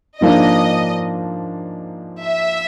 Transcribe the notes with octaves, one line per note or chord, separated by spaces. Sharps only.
G#2 F3 A#3 D4 D#5
E5